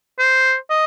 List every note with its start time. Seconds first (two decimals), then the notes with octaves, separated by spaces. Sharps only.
0.19 C5
0.70 D#5